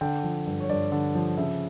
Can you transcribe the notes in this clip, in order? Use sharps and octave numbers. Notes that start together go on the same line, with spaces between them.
D3 G5
F3
G2
C#5
G2 D5
D3
F3
C#3 E5